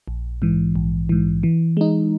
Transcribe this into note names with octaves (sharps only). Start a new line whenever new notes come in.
A#1
G#2 E3
A#1
G#2 E3
E3
G#3 D#4